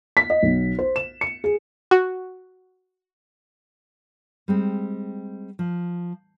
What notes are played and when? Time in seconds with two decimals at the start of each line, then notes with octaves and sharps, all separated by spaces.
0.17 B6
0.30 D#5
0.43 B1
0.79 C5
0.96 E7
1.21 C#7
1.44 G#4
1.91 F#4
4.48 G3 G#3 C4
5.59 F3